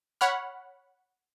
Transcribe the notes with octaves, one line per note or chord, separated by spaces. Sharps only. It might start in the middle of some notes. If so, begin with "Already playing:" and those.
C#5 F#5 B5 F6